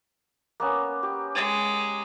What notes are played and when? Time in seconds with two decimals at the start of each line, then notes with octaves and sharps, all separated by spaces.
0.60 A#3 B3 C#4
1.03 G4
1.35 G#3